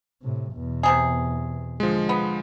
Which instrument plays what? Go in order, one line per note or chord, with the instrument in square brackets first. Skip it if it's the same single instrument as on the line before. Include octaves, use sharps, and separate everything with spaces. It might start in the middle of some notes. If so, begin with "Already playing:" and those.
[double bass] A2 C3
E2 B2
[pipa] C3 F#3 G#4
[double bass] D3 [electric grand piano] F3 G#3
[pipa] B3